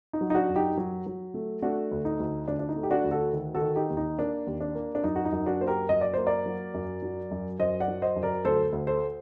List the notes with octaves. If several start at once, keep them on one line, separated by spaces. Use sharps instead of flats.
D#4
F#3
D#4
D4 F#4
F#2
D#4 G4
F#3
F#3
A3
A3 D4 F#4
D2
D#4
D2
D2 D4
D4
D#4
A3
G4
D4 F#4
D2
F#4 A4
D#3
F#4 A4
D#3
D#4 G4
D#2
D#4
A#3 D4
D#2
D4
A#3
D4
F#2 D#4
F#4
D#4
F#2
D4 F#4
A#3 C5
G4 A#4
F#2 D#5
D5
A#3 C5
A#4 D5
F#3
F#2
F#3
F#2
F#2 C5 D#5
D5 F#5
F#3
C5 D#5
F#2
A#4 D5
D2 A4 C5
D2
A4 C5